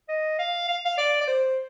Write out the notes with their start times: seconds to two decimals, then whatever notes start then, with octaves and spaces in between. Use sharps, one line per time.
0.09 D#5
0.39 F5
0.68 F5
0.85 F5
0.98 D5
1.21 D5
1.27 C5